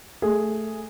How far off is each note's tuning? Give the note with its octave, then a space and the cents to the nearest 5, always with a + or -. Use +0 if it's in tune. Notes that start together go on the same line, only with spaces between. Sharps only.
A3 +0 G#4 +0